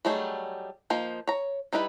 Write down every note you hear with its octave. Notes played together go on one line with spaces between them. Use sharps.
F#3 G3 A3 D#4 G#4
F3 A#3 D#4 C5
C#5 A#5
G3 D#4 E4 A#4 B4